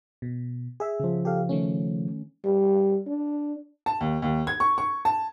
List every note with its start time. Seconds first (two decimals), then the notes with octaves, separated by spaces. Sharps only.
0.22 B2
0.80 G#4 E5
1.00 C#3 F3
1.25 G4 A4 F5
1.49 D#3 A3 C#4
2.45 G3
3.07 D4
3.86 A5
4.01 D#2
4.22 D#2
4.47 G#6
4.60 C#6
4.78 C#6
5.05 A5